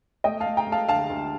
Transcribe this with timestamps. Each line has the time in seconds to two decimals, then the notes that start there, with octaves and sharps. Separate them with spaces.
0.24 A3 D#5 G5
0.40 F5 A5
0.46 A3
0.57 G5 A#5
0.67 A3
0.72 F5 A5
0.88 D2 F5 A5
1.10 D2